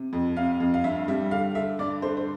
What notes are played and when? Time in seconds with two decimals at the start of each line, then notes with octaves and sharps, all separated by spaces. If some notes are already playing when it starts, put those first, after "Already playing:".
Already playing: C3
0.13 F2
0.36 C3 F5
0.60 F2
0.74 F5
0.84 G2 E5
1.08 G3 E5
1.31 D3 F5
1.55 D3 E5
1.79 G2 D5
2.02 D3 C5
2.17 C5